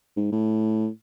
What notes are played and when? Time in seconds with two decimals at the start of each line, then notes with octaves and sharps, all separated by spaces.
0.17 G#2
0.32 A2